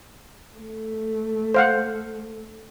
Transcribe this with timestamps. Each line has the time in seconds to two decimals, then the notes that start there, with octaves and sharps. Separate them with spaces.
0.57 A3
1.54 C5 F5 F#5